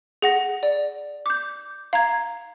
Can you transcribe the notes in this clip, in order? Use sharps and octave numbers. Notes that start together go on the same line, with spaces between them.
G#4 F#5 A#6
D5
D6 G6
F5 A#5 G#6